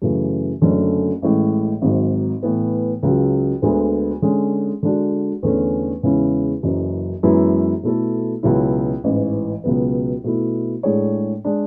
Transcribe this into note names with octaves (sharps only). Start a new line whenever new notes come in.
F#2 C#3 E3 A3
F#1 F#2 D3 A3 C#4
A1 A2 G#3
G#1 G#2 F#3
A2 E3 B3
C#2 C#3 F#3
D2 D3 G#3 B3
D3 G#3 C#4
D3 G#3 D4 F#4
E2 D3 A3 C#4
E2 C#3 G#3 C#4 E4
F#1 F#2 E3
F#2 E3 G#3 B3 E4
B2 A3 E4 A4
C#2 B2 F#3 C#4 E4
A1 G#2 E3
C#2 B2 F#3 B3
B2 A3 E4
A2 G#3 D4 G#4 C#5
G#3 D4